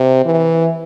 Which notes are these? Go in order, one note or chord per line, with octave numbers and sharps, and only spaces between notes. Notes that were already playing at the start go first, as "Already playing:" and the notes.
Already playing: C3
E3